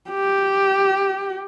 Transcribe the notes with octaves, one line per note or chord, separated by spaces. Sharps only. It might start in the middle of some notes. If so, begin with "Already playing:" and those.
G4